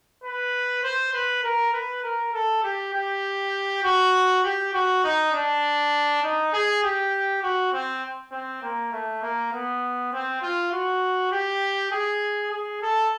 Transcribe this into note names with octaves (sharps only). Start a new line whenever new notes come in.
B4
C5
B4
A#4
B4
A#4
A4
G4
G4
F#4
G4
F#4
D#4
D4
D#4
G#4
G4
F#4
C4
C4
A#3
A3
A#3
B3
C4
F4
F#4
G4
G#4
G#4
A4